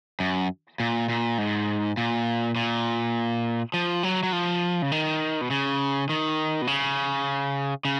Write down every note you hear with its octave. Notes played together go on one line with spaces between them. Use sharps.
F#2
A#2
A#2
G#2
A#2
A#2
F3
F#3
F#3
F3
C#3
D#3
B2
C#3
D#3
B2
C#3
C#3